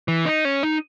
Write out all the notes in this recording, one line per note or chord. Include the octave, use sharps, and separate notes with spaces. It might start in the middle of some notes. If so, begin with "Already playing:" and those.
E3
D#4
C#4
D#4